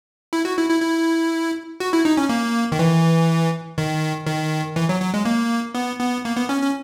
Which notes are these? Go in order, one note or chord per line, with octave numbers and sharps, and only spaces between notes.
E4
F#4
E4
E4
E4
F#4
E4
D#4
C#4
A#3
D#3
E3
D#3
D#3
E3
F#3
F#3
G#3
A#3
B3
B3
A#3
B3
C#4
C#4